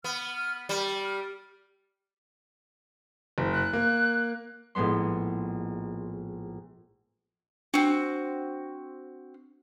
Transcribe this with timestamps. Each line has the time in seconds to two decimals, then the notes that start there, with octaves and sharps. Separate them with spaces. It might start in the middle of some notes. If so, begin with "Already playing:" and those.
0.04 B3 F6
0.69 G3 A#4
0.88 G5
1.03 F6
3.38 F#1
3.52 F#6
3.73 A#3
4.75 A#1 A2 G#3 B3 C6
7.74 C4 D4 F#4